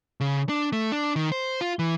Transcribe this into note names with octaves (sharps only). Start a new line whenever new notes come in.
C#3
D4
A3
D4
D#3
C5
F4
E3